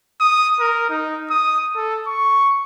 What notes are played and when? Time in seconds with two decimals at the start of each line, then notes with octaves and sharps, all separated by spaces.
0.21 D#6
0.60 A#4
0.90 D#4
1.30 D#6
1.76 A4
2.07 C#6